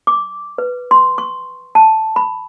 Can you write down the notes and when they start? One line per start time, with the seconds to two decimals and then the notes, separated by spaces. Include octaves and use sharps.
0.07 D6
0.58 B4
0.91 C6
1.18 C#6
1.75 A5
2.16 B5